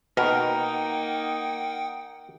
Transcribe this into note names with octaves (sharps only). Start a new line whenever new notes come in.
B2 A#3 D#4 A#4 F#5 G5